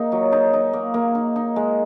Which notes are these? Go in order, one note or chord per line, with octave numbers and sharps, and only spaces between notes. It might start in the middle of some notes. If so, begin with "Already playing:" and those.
Already playing: A#3 D#4 G#4
F#3
D#4
D#4
A#3
A#3
D#4
D#4
G#3